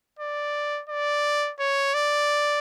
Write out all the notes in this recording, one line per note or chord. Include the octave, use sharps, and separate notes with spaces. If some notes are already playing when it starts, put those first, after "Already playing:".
D5
D5
C#5
D5